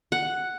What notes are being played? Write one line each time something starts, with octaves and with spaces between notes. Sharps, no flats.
F#5